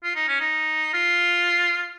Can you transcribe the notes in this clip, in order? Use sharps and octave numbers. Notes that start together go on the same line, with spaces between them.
F4
D#4
C#4
D#4
F4